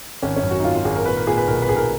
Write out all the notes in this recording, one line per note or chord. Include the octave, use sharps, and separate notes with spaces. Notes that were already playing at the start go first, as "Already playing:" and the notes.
G#1 C#4
C#4
F#2
F#4
D#4
G#1 F4
F4
G#1 G#4
A#4
A#2 B4
A#4
A#2 G#4
B4
B1 A#4
B4
B1 G#4
A#4